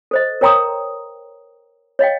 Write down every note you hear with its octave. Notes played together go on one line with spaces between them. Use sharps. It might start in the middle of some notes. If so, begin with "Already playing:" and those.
A4 C5 D#5
A#4 C#5 G5 A#5 C6 D#6
C#5 D#5 F5 G5